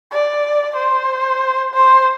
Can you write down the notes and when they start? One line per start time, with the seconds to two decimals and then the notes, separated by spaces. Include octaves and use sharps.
0.11 D5
0.76 C5
1.74 C5